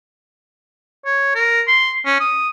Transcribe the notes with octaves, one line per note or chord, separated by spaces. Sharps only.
C#5
A#4
C6
C#4
D#6